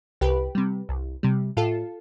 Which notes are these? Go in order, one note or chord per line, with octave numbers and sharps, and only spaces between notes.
C2 G4 B4
C3 G3
C2
C3 G3
A2 F4 A4